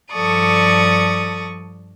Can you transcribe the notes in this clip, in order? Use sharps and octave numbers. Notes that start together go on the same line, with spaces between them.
G2 F3 A4 D5 C#6 D#6